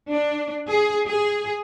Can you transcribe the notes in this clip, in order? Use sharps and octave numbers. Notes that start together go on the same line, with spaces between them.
D4
G#4
G#4